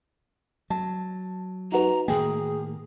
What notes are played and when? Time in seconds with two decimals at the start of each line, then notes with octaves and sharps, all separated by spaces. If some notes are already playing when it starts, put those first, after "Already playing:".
0.70 F#3 A5
1.72 D#4 F#4 B4 A#5
2.08 A2 D#3 A#3 G#4 G5 G#5